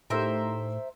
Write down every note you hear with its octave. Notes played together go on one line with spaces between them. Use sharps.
A2 A3 D#4 G4 A#4 C5 E5